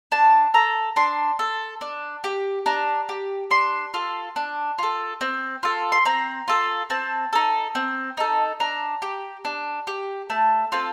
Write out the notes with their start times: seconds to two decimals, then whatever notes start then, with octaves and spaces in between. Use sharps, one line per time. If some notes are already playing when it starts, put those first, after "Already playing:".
0.12 D4 A5
0.54 A4 A#5
0.96 D4 C6
1.39 A4
1.81 D4
2.24 G4
2.66 D4 A#5
3.09 G4
3.51 D4 C6
3.94 F4 A4
4.36 D4
4.78 F4 A4
5.21 C4
5.63 F4 A4
5.92 C6
6.05 C4 A#5
6.48 F4 A4
6.90 C4 A5
7.33 D#4 A4
7.75 C4
8.17 D#4 A4
8.60 D4 A#5
9.02 G4
9.45 D4
9.87 G4
10.30 A3 A5
10.72 C4 F4 A4